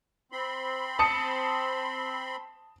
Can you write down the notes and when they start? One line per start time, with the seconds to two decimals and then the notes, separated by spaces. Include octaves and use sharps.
0.32 C4 B5 C6
0.99 A5 D#6 C#7